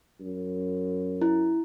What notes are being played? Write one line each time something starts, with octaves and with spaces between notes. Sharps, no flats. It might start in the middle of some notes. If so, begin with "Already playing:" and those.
F#2
E4